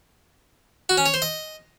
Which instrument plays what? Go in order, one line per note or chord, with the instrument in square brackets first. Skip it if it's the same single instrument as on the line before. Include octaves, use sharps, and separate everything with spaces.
[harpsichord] F#4
C#4
C#5
C5
D#5